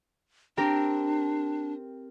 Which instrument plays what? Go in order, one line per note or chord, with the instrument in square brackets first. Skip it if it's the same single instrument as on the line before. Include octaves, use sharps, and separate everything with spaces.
[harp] C4 G4 A#4 [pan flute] D4